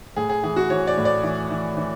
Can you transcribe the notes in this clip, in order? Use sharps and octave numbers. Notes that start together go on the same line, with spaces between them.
A2 G#4
G#4
E3 G#4
F#4
E3 C#5
D5
A2
D5
E3
E3
E3